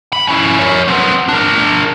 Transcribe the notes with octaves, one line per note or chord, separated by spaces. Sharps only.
B5
C#4 E4
A#4 C#5
B3 C4
D4 A#4